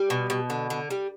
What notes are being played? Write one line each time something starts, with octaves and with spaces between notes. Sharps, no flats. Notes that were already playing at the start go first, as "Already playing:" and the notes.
Already playing: G3
B2
B2
D3
D3
G3